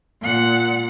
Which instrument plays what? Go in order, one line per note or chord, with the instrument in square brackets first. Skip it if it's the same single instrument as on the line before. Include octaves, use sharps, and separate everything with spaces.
[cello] A#2 F#5